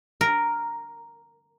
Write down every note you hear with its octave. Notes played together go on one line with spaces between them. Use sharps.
A#4